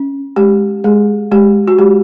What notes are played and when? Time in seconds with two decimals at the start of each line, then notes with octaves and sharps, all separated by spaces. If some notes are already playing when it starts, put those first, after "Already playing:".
Already playing: C#4
0.36 G#3 G4
0.84 G#3 G#4
1.32 G#3 G4
1.68 F#4
1.78 G#3 G4